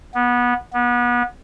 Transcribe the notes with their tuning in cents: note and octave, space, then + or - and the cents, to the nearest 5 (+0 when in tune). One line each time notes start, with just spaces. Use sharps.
B3 -20
B3 -30